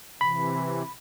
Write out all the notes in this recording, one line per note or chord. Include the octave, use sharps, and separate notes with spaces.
C3 E3 B5